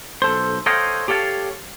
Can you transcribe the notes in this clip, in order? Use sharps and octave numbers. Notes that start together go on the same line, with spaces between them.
B1 A4 C5
A4 C5 C#5 D#5 F5 G5
G4 A4 C#5 F5 A5